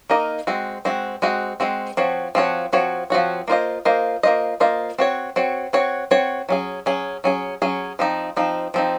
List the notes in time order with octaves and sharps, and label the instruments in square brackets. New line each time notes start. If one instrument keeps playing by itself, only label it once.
[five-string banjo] A#3 D#4 A#4 D#5
G#3 C4 F#4
G#3 C4 F#4
G#3 C4 F#4
G#3 C4 F#4
F3 C4 F#4 C#5
F3 C4 F#4 C#5
F3 C4 F#4 C#5
F3 C4 F#4 C#5
A#3 F4 C5 D#5
A#3 F4 C5 D#5
A#3 F4 C5 D#5
A#3 F4 C5 D#5
C4 F#4 C#5
C4 F#4 C#5
C4 F#4 C#5
C4 F#4 C#5
F#3 C#4 G#4
F#3 C#4 G#4
F#3 C#4 G#4
F#3 C#4 G#4
F3 C4 D#4
F3 C4 D#4
F3 C4 D#4